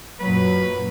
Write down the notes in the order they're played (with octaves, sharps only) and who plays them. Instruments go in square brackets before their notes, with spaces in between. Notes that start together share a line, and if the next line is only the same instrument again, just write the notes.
[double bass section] F#2 A#2 [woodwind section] F#3 [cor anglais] B4